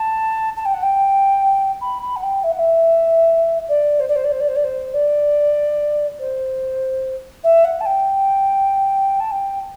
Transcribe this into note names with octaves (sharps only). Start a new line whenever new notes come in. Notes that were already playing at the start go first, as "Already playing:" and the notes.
Already playing: A5
A5
G5
F#5
G5
B5
B5
F#5
G5
E5
F#5
E5
D5
C5
D5
C5
D5
C5
D5
C5
D5
C5
D5
C5
E5
F#5
A5
G5
A5
G5